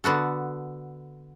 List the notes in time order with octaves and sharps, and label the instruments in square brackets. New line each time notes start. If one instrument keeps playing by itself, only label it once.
[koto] D3 B3 F#4 A4